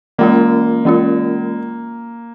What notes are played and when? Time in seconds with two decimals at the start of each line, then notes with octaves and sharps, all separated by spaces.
0.19 E3 G#3 A#3 C#4 F4
0.85 E3 G#3 C#4 F4